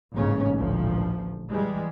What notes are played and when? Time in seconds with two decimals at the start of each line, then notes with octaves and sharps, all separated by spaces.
0.15 A1 G#2 C#3 A#3 C#4
0.56 A1 D2 A#2 F3
1.50 E3 G3 G#3